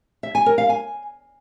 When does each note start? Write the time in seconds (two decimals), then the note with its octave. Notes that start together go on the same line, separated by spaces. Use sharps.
0.23 E5
0.35 G#5
0.46 A#4
0.58 F5
0.69 G#5